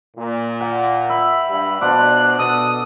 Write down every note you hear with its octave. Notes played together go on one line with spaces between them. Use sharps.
A#2
F#5 G5
E5 B5
G2
B2 D4 F4 C5 D5 F#6
B2 A4 D#6